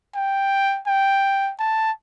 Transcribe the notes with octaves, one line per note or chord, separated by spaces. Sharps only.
G5
G5
A5